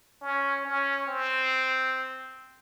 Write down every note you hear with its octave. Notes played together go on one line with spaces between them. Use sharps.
C#4
C#4
C4